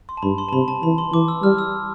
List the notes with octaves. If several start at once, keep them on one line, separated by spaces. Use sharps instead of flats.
C6
A5
G2 B5
C6
A5
C3 B5
A5
E3 B5
C6
E3 D6
E6
G3 F6
E6